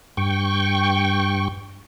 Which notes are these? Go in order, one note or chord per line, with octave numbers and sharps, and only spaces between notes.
G2 G5 C#6